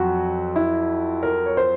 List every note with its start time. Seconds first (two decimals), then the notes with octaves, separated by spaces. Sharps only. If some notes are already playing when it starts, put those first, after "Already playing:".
Already playing: F2 F#3 F#4
0.56 E4
1.23 A#4
1.46 C#5
1.57 C5